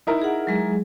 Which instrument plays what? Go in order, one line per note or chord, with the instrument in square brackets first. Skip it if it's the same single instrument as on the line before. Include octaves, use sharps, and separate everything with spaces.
[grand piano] D#4 E4 A#4
[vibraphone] G#4 F#5
F#3 G#3 G#4